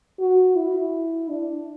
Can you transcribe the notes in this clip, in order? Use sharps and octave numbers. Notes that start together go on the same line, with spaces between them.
F#4
E4
D4